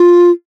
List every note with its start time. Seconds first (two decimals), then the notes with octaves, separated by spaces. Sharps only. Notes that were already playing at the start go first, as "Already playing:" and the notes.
Already playing: F4